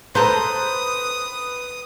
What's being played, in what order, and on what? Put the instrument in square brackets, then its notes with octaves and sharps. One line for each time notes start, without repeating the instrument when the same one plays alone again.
[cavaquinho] A4 A#5 C6 [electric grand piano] B4 [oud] C5 [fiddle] D#6